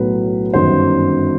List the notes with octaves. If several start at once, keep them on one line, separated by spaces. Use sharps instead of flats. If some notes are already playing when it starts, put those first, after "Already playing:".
Already playing: B1 A2 F#3 B4
G1 F#2 D#3 F#3 C5